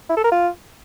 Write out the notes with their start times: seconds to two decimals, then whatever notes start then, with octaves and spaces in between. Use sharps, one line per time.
0.09 E4
0.17 A4
0.24 A#4
0.32 F4